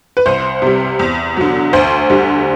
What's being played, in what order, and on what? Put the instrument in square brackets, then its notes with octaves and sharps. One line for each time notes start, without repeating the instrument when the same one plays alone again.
[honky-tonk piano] B4
C2 C5
C3 G3
E2
D3 F#3
D2 C5
D3 G3